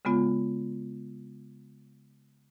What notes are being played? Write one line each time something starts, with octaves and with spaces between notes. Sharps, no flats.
C#3 G#3 B3 F4